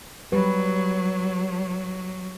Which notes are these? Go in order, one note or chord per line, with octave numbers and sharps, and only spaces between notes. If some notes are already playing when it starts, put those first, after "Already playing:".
F#3 G3 G4 B4